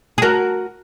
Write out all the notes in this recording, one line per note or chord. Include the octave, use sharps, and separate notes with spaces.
G#4
F#4 A#4